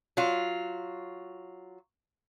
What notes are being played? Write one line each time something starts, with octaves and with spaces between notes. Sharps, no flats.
F#3 F4